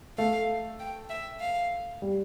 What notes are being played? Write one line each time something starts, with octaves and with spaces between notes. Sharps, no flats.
A3 F5
G5
E5
F5
G3